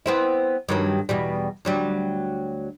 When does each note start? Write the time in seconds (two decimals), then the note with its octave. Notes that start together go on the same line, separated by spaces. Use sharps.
0.06 B3 C4 E4
0.69 G2 D#3 F#3
1.09 E2 B2 G3
1.65 D2 F#3 G3